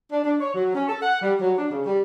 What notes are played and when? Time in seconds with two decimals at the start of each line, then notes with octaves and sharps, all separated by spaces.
0.11 D4
0.24 D4
0.40 C#5
0.54 F#3
0.74 C#4
0.89 A4
1.02 F#5
1.21 G3
1.40 F#3
1.57 D4
1.71 C#3
1.86 G3